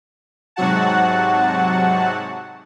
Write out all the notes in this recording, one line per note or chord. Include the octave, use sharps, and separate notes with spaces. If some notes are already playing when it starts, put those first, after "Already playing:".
G#2 C3 F#3 F#4 F#5 A5